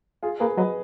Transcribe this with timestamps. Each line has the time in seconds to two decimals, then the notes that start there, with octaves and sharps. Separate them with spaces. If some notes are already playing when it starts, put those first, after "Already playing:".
0.23 F4 G#4
0.40 A#3 G#4 B4
0.57 F#3 B4 D#5